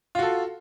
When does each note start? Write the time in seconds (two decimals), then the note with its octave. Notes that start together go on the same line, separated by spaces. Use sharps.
0.15 F4
0.19 F#4
0.22 A4